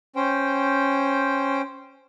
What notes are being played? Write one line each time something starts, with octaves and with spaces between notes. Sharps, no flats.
C#4 C5 G5